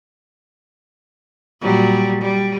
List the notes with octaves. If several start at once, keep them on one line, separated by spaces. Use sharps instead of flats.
A#2 F#3 G3
G3